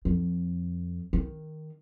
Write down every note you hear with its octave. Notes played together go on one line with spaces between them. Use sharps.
F2
D#3